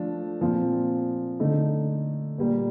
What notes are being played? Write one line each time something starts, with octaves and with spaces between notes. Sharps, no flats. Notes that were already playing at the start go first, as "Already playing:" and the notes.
Already playing: F3 A3 D4
A#2 F3 C4
D3 A3 D#4
A#2 G3 A#3